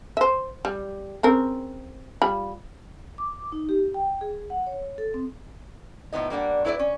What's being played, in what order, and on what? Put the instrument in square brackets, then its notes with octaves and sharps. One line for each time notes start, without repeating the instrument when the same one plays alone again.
[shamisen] C5 E5
G3
C#3 C4 A#4
G3 F4 B5
[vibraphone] D6
D#4
G4
G5
G#4
F#5
C#5
A4
C4
[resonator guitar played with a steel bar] A2 F3 B3 D#4 D#5
G3 A#3 D4 F#5
F#3 E4 B4 C#5 D5
C#4